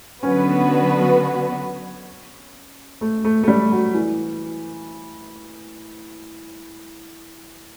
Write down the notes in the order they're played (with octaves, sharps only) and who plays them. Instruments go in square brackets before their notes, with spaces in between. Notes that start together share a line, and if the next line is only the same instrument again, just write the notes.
[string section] D3 F#3 B3 F#4 B4 [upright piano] C#4
[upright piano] A3
A3
A3
G3
F#3
E3